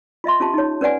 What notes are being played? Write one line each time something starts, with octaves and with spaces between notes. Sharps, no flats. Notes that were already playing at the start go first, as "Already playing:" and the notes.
F4 D#5 E5 C6
C#4 F4 G4 A5
D#4 C#5
C#4 B4 D5 F#5 G#5